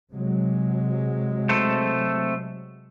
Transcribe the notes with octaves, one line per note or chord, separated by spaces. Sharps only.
C3 F#3 G#3
A3 C4 A4